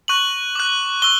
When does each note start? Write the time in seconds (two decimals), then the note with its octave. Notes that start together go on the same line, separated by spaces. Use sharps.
0.08 C#6 F#6 F#7
0.55 D6 F#6
1.02 C#6 E6 G7